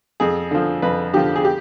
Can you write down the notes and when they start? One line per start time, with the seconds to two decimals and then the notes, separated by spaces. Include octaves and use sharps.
0.20 F2 G#4
0.51 D3 F3
0.82 F2 B4
1.13 D3 F3 G4
1.36 G#4
1.45 G4